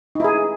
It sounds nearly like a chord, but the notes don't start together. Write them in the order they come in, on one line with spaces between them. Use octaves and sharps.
D#4 E4 G#4